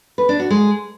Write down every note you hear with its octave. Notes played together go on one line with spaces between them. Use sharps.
B4
D4
F#4
G#3